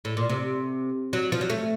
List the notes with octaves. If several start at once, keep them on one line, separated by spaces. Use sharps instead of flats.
A2
A#2
C3
F#3
F3
F#3
A3